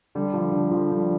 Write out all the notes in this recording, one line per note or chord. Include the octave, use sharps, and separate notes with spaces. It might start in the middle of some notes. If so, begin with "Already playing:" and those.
D3 G3
F3
D3
F3
D3 G3